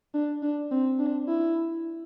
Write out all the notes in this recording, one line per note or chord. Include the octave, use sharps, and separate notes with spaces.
D4
D4
C4
D4
E4